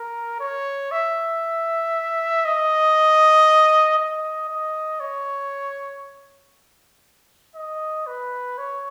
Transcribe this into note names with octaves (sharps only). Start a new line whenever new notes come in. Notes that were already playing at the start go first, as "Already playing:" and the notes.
Already playing: A#4
C#5
E5
D#5
D#5
D#5
C#5
D#5
B4
C#5